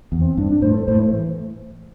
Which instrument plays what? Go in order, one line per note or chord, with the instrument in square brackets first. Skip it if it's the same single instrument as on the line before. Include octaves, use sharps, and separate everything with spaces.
[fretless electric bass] E2
[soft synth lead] C4
[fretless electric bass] G2 [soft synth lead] D4
[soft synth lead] D4
[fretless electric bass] A2 [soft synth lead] C5
[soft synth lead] A4
[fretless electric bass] A2 [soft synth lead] C5
[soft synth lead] A3
E3